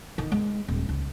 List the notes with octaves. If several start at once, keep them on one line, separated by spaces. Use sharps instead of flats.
D#3
G#3
D#1
C#2